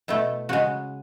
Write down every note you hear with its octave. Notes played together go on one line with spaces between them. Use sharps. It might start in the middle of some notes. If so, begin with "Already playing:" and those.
B2 A3 E4
C#3 G#3 F#4